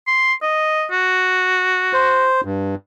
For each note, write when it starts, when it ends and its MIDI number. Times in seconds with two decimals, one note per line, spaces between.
0.07 0.34 84
0.43 0.86 75
0.92 2.28 66
1.93 2.41 72
2.44 2.75 43